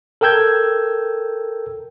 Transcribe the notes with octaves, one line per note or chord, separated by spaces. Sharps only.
A4 A#4 G5 E6 G6 G#6